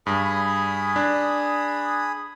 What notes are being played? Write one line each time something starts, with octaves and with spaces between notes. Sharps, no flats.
G2 G#4 B5 D#6
D4